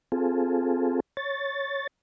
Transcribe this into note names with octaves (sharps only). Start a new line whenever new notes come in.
C4 F4 G#4 A4
C#5 A6